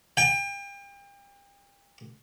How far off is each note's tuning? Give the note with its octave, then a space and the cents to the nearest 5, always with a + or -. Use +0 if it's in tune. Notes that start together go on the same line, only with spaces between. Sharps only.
G5 +35